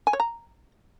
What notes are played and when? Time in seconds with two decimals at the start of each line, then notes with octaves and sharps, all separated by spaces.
0.07 G#5
0.13 C#5
0.20 A#5